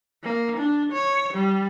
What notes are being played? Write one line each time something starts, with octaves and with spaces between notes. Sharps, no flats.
A#3
D4
C#5
G3